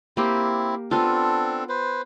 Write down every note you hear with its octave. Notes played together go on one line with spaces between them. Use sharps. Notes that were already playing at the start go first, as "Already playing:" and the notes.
A#3 C4 E4 G4
B3 C4 D4 F4 A4
B4 C5